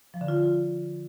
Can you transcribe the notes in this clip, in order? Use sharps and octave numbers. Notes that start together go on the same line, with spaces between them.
F3
D3
F4